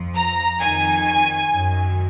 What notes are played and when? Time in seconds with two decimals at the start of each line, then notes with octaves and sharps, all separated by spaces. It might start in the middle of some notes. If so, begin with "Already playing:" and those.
Already playing: F2 F3
0.15 A#5
0.60 F2 D#3 G#5
1.52 F#2 D#3